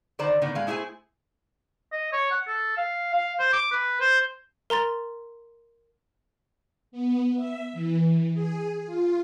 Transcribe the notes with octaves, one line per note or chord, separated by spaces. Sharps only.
D3 D#3 C5 D5 A#5
A2 D3 D#3 B3
A2 G#3 F5
A3 E4 G#4 C5 G#5
D#5
C#5
F#5
A4
F5
F5
C5
D6
B4
C5
A#4 A#5 C6 A6
B3
E5
E3
G#4
F4